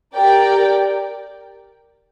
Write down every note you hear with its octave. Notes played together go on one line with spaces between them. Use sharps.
G4 A#4 D5 G5